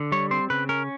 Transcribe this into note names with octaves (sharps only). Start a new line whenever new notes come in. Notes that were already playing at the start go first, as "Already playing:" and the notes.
Already playing: D3
G3 C#5
C4 C5
C#3 B4
C#4 A#4